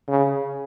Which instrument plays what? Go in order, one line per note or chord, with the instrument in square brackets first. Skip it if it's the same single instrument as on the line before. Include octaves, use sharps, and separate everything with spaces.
[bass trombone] C#3